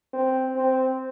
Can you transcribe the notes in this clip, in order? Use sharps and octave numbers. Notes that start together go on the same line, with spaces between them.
C4
C4